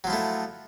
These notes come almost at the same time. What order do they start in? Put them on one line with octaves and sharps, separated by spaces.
F#3 F3 E4 A3